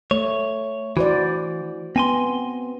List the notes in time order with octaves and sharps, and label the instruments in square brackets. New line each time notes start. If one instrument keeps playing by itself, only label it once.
[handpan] A3 [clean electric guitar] C#5
[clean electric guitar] E3 [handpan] F#4 C5 D5
[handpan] B3 [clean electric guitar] C4 G#5 C6